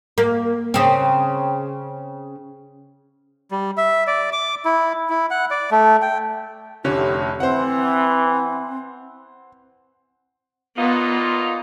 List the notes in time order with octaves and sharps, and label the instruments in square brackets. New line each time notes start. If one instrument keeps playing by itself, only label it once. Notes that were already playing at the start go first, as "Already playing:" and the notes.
[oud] A#3
C#3 C4
[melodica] G3
E5
D5
D6
E4
E4
F#5
D5
A3
G5
[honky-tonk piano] F1 D3 C#4 [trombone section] A2 [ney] G4
[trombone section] E3 [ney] C4 [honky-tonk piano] C5 F#5
[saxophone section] A#2 D#4 F4 [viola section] B3